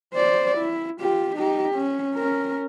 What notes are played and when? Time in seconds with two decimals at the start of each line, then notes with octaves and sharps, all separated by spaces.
0.14 C5 D5
0.58 E4
1.01 F4 G4
1.36 D#4 G4
1.75 C#4
2.15 C#4 A#4